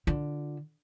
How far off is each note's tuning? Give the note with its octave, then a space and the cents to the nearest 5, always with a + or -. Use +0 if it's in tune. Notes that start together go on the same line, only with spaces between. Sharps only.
D3 +0 F4 +10